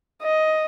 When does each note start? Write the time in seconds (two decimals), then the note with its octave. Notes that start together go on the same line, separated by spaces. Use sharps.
0.23 D#5